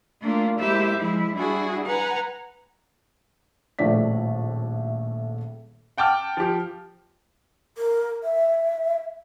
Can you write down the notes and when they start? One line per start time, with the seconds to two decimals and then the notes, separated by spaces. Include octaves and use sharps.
0.22 A3 A#3 D4 F4
0.60 G#3 A#3 E4 G4 C5 E5
0.98 F3 G#3 E4
1.34 G3 D4 E4 F#4 G#4
1.86 B4 F#5 G#5 A#5
3.79 D#1 A#1 A2 A3 D5 B6
5.98 F#5 G5 A5 D6 F6
6.37 F3 G4
7.78 A#4
8.23 E5